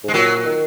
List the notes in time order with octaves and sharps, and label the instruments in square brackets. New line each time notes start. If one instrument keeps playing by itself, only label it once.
[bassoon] G#2 [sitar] G#3
[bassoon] A#2 [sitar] F#3
[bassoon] D#3